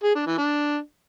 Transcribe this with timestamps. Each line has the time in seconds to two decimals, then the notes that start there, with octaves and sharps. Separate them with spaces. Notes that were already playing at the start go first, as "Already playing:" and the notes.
0.04 G#4
0.15 D4
0.27 E3
0.38 D4